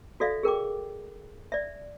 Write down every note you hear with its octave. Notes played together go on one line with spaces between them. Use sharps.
F#4 A4 D5 E5 F5
G#4 A#4 G5 D6
D5 E5